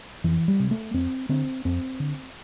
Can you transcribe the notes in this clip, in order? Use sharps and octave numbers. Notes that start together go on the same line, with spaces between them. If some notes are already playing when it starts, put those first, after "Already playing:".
F2 E3
G3
C3
A3
F2 C4
D3 C4
F2 C4
D3